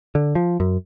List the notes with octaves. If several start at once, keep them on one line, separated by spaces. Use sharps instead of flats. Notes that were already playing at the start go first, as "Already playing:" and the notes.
D3
F3
F#2